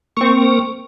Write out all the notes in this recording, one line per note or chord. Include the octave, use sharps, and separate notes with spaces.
A#3 C4 A#4 C#6